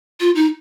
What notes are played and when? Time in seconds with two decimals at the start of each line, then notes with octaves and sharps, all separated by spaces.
0.20 F4
0.35 D#4